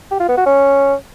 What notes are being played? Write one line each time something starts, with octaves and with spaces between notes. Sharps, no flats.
G4
F4
B3
F#4
C#4